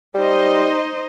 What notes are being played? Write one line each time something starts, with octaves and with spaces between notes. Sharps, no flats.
G3 D#4 C5 D#5